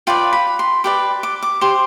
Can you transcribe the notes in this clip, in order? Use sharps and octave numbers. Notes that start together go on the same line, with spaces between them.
F4 B4 D5 G5
B5
C6
G4 B4 D5 D6
D6
D6
G4 C5 C6